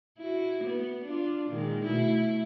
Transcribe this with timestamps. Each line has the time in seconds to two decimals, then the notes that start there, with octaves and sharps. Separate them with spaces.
0.18 E4 F#4
0.63 B3
1.04 D4 F4
1.48 A#2 D#3 G#3
1.84 B2 A3 E4